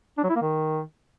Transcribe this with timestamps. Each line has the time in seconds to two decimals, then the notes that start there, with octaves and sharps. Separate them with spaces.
0.18 D4
0.24 F#3
0.30 E4
0.36 A#3
0.42 D#3